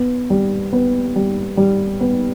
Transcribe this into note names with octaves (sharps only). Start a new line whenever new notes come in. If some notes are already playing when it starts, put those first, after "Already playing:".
Already playing: B3
G3
B3
G3
G3
B3